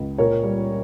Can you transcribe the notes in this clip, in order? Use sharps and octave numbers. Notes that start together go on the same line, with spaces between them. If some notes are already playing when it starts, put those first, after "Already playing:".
Already playing: C#2
A#2 A#4 C#5
G3